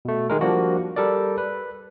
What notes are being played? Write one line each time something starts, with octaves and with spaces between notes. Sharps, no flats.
B2 A3
D#3 G#3 A#4
F3 G3 A#3 D4 F#4
G3 A4 A#4 D5
B4